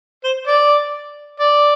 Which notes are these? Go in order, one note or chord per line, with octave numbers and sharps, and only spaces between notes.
C5
D5
D5